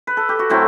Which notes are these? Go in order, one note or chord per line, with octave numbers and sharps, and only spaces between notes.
B4
A4
G4
F#4
A2 F#3 A3 C4 E4